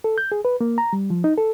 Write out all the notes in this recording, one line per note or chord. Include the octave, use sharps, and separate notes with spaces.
A4
G6
G#4
B4
A#3
A#5
G3
F3
D#4
A4